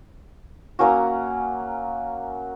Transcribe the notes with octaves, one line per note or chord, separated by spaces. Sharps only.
F#3 A#3 C#4 F#4